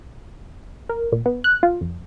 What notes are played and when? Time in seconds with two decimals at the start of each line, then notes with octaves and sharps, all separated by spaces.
0.89 A#4
1.12 A#2
1.26 B3
1.44 F#6
1.63 F4
1.81 F2